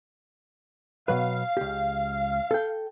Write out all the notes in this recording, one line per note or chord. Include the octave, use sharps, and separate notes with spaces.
B2 F#3 B4 F5
C#2 G4
A4 G5